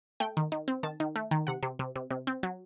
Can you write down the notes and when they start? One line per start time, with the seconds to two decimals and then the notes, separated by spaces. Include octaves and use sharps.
0.20 A3 G5
0.37 D#3
0.52 D#3
0.68 C4
0.83 D#3 A5
1.00 D#3
1.16 A3
1.31 D#3
1.47 C3 F#5
1.63 C3
1.79 C3
1.96 C3
2.11 C3
2.27 C4
2.43 F#3